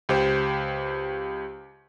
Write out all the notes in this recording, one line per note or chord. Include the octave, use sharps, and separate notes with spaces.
C#2 G4 C5